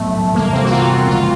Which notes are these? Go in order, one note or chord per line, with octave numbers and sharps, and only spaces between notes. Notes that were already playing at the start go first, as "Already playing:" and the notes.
Already playing: A2 F#3 A3 B3
C3 E3 G3 A#3 B3
C4
F#4
F4
C#3 F3 G#3 B3 F4